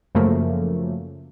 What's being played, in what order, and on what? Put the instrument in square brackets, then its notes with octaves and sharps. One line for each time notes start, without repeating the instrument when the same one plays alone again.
[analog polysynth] F#2 C#3 F3 A3 A#3